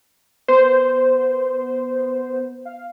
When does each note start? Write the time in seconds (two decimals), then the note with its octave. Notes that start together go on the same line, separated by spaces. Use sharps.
0.48 B3 C5
2.65 F5